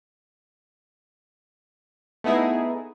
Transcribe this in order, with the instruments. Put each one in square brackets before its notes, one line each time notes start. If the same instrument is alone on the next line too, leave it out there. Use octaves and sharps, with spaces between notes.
[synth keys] A3 B3 D#4 E4 G#4